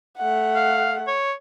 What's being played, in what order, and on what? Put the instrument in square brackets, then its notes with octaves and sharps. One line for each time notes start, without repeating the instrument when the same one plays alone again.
[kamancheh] A3 F#5
[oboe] F5
C#5